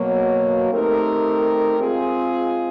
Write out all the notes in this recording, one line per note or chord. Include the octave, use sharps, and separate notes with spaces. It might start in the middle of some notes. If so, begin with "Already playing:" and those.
Already playing: B2 F#3 A#3
A3 C4 D#4 G4 A#4
G#3 C4 F4 G#4